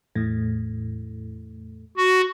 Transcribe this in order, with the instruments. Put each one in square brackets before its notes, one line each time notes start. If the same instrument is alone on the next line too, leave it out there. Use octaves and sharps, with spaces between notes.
[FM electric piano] E2 A2
[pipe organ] F#4